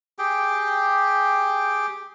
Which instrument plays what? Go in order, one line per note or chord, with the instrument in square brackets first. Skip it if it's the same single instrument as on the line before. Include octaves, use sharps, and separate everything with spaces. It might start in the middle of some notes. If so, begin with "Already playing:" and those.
[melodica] G4 G#4 G5